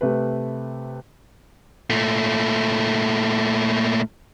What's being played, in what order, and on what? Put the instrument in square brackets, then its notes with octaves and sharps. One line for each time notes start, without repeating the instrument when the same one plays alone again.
[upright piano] C3 A3 B4
[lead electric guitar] A#2 A3